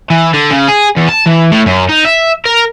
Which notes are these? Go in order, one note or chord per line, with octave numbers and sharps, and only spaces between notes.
E3
D3
C#3
G#4
E2
A5
E3
A2
F#2
D#4
E5
A#4